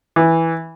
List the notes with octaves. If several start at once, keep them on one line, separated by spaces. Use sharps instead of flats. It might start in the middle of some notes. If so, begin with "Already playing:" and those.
E3